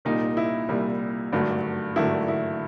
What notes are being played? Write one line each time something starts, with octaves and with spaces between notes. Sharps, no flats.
C2 A#2 G3 D#4
E4
C2 A#2 G3
G#1 G2 D3 F#3 A3
G#1 G2 D3 F#3 A3 E4
E4